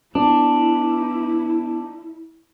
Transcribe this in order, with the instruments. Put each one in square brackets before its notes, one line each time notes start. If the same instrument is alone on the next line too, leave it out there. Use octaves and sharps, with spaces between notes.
[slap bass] B3 [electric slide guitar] D4 [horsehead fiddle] E4